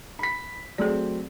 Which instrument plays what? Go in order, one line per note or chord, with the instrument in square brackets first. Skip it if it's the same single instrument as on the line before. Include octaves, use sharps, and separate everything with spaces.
[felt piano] B5 B6
[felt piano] F#3 A3 C4 [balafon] G#4 D5